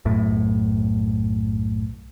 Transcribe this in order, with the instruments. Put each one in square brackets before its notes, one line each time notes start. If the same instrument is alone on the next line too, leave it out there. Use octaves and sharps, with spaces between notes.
[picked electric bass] B1 F#2 A2